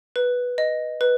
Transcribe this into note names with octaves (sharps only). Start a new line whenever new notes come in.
B4
D#5
B4